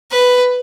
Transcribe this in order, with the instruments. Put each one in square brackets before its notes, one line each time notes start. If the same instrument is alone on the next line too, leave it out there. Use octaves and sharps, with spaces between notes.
[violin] B4